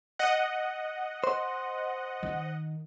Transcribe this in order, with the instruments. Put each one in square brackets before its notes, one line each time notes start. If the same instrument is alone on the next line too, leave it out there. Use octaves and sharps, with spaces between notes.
[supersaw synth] D#5 F#5
[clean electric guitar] C5
[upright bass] D#3